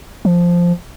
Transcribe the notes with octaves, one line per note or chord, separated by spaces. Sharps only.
F3